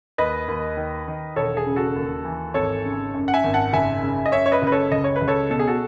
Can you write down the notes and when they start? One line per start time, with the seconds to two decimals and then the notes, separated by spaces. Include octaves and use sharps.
0.18 D#2 B4 D#5
0.48 D#2
0.77 D#3
1.08 D#3
1.36 E1 A4 C#5
1.57 G#4
1.66 C#3
1.76 F#4 A4
1.96 D#2
2.25 E3
2.54 G#1 A4 C#5
2.85 C#3
3.14 F#2
3.28 F#5
3.34 E5 G#5
3.44 G#1
3.53 F#5 A5
3.73 F#1 E5 G#5
4.03 C#3
4.26 D#5
4.32 F#2 C#5 E5
4.46 C#5
4.52 B4 D#5
4.62 F#1 B4
4.72 A4 C#5
4.91 C#2 D#5
5.04 C#5
5.16 B4
5.21 C#2
5.28 A4 C#5
5.50 B2 A4
5.59 G#4
5.67 F#4 A4